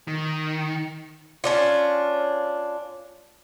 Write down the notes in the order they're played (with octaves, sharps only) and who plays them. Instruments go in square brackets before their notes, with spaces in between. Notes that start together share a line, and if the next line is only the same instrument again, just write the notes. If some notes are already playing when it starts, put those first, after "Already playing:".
[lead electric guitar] D#3
[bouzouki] C#4 D4 F4